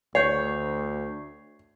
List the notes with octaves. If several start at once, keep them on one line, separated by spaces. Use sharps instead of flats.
D2 C#5 C#6 G6 C7